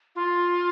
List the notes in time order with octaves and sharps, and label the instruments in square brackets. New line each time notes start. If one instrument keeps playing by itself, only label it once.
[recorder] F4